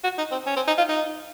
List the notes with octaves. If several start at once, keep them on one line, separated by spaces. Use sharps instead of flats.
F#4
D#4
C4
C#4
C4
D#4
F4
D#4